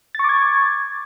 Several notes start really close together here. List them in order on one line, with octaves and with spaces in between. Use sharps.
A6 C#6 D6 G#6